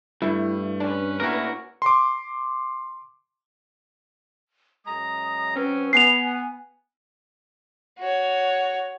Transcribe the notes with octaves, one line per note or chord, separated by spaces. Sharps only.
G2 A3 E4
C#4 D4 B4
A2 A#3 E4 F#4 A#4
C6 D6
F#2 G#3 A#5 D#6
F#3 C4 C#4 B4
B3 G#5 C7 F7
F#4 C#5